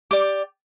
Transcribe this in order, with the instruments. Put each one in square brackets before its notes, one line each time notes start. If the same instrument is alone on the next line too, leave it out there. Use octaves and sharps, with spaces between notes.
[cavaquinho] G4 D5 D6